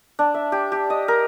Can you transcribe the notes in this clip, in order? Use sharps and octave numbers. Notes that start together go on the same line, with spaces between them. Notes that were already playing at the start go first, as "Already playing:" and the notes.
D4
E5
G4
G4
D#5
A#4